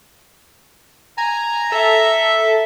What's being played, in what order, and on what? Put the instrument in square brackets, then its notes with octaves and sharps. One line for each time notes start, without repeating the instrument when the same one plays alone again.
[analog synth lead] G#5 [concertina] A#5
[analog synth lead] A4 [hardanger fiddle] E5